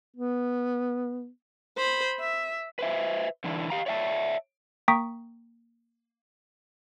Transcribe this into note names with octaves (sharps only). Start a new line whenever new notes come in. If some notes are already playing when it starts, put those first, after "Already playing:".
B3
C5 B5
E5
B4 C5 E5
D3 E3 D4 E4
G4 F5 A#5
C#5 D5 E5 G5 A5
A#3 G5 A#5 C#6 D#6 B6